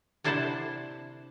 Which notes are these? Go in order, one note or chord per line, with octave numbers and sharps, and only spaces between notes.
C3 D4 E4 C5 F#5 A5